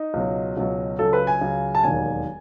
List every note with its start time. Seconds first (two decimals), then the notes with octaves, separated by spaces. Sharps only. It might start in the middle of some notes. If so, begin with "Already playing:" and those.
Already playing: D#4
0.14 C#2 B2 F#3
0.57 C#2 B2 F#3
0.99 C#2 C#3 F#3 A4
1.13 B4
1.27 G#5
1.41 C#2 C#3 F#3
1.75 A5
1.83 E1 D#2 D#3 F#3 G#5